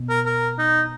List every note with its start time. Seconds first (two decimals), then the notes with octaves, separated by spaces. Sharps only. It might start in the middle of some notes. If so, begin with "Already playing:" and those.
Already playing: B2
0.09 A#4
0.26 A#4
0.59 D#4